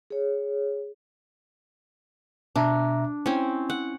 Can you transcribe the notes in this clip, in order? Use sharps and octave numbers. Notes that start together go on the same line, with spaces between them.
G#4 C#5
B2 D4 E5 A#5
C4 C#4 E4
F#5